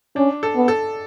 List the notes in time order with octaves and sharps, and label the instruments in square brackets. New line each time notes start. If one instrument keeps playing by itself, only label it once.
[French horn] C#4 [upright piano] D4
[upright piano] A4
[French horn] B3
[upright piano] A4